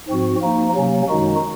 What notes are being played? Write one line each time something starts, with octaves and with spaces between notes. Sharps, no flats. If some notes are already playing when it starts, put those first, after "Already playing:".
G#2 F3 C4 F#4
F3 A#3 D#4
C3 F#3 A#3 C#4
F#2 D#3 G#3 D#4 F#4